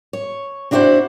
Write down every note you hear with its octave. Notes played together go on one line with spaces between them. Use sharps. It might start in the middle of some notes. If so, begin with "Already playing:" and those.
C#5
C4 D4 E4 F#4 B4 C5